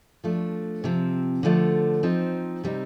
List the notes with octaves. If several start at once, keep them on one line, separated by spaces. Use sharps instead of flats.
F3 A3 D4
C3 F3 C4
D3 F3 A3 D4
F3 C4 D#4
C3 G3 C4 D#4